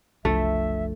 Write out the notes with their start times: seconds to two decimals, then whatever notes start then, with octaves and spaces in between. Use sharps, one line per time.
0.25 F#1 C2 F3 A3 D4 E5